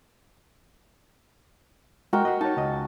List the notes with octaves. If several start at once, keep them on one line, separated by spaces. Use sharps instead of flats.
G#3 F#4 A#4 G5
D#5 F#5
D#4 C#5 A5
C#2 D#5